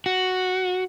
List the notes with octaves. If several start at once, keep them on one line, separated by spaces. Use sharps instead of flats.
F#4